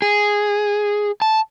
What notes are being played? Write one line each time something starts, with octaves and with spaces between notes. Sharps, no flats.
G#4
A5